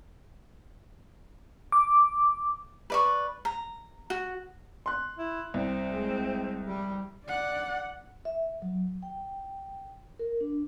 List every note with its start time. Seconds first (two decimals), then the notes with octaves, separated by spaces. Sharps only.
1.72 D6
2.90 B4 D5 C#6
3.45 A#5
4.10 F#4
4.86 C6 F#6
5.19 E4
5.54 C2 C4
5.91 G#3
6.67 G3
7.25 D5 F#5
8.25 E5
8.62 F#3
9.03 G5
10.19 A#4
10.41 D4